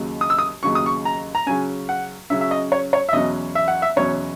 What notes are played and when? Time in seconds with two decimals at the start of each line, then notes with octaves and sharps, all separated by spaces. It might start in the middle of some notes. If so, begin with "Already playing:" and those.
Already playing: D#2 C#3 F#3
0.21 D#6
0.30 E6
0.39 D#6
0.63 D#2 C#3 F#3 C#6
0.75 D#6
0.86 C#6
1.05 A#5
1.35 A#5
1.46 C#3 F#3 C#4 G#5
1.89 F#5
2.30 C#3 F#3 C#4 E5
2.41 E5
2.51 D#5
2.72 C#5
2.93 C#5
3.09 E5
3.13 E2 B2 F#3 C#4 D#5
3.55 E5
3.68 F#5
3.82 E5
3.96 E2 B2 F#3 C#4 C#5